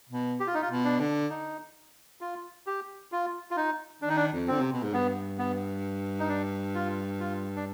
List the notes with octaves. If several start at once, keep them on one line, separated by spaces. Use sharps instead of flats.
B2
G4
F4
D#4
F4
B2
D4
D3
D#4
F4
G4
F4
F4
D#4
D#3 D4
D#4
D4
F2
D3 C4
C3
B2
G#2
G2 B3
B3
D#4
D4
F4
F4
D4